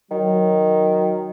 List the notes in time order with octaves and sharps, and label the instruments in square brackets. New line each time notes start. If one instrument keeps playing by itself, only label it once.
[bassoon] D#3 [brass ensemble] F#3